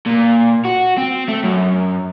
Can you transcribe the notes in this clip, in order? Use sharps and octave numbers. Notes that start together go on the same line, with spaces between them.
A#2
F#4
C4
A3
F#2